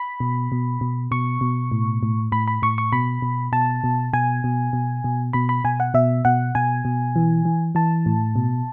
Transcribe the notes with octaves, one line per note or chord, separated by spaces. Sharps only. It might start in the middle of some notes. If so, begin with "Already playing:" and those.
Already playing: B5
B2
B2
B2
B2 C#6
B2
A2
A2
A2 B5
B5
A2 C#6
C#6
B2 B5
B2
B2 A5
B2
B2 G#5
B2
B2
B2
B2 B5
B5
B2 G#5
F#5
B2 E5
B2 F#5
B2 G#5
B2
E3
E3
E3 A5
A2
B2